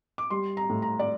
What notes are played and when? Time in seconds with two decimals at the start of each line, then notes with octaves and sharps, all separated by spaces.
0.18 D6
0.30 G3 C6
0.57 A#5
0.69 A2
0.82 A#5
0.99 D5